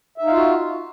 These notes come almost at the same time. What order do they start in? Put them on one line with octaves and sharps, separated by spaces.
E5 D#4 F5 F4 F#4